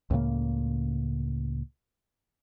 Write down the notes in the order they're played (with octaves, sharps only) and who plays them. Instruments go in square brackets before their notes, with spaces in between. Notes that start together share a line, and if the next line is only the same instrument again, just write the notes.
[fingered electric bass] C#2 A2 C#3 A#3